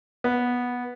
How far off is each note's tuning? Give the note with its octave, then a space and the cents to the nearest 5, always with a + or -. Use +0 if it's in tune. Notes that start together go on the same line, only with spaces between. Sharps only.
B3 -10